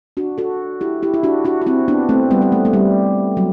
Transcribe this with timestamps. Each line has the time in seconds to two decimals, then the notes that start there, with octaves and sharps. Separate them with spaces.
0.17 D4 F#4
0.38 F#4 A4
0.81 E4 G4
1.02 E4 G4
1.14 E4
1.23 D4 F#4
1.45 D4 F#4
1.62 F#4
1.66 C4 E4
1.88 B3 D4
2.09 A3 C4
2.30 G3 B3
2.42 B3
2.52 A3
2.65 A3
2.73 G3
3.37 F#3